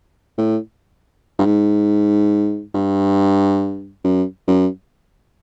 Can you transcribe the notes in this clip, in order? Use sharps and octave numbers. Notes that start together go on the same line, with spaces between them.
A2
G2
G#2
G2
F#2
F#2